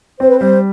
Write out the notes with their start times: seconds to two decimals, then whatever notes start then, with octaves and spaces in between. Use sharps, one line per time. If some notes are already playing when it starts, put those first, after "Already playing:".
0.20 C4 C5
0.29 B4
0.38 G3 C5